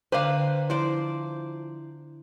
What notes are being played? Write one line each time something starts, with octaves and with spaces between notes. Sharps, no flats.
D3 B4 C5 F5 G5 A#5 D6
F3 E4 C5 D5